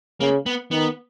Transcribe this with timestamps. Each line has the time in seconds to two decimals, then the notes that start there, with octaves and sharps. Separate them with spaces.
0.21 C#3 A#3
0.46 B3
0.71 D#3 B3